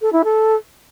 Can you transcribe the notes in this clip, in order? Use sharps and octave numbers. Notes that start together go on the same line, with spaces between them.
A4
E4
A4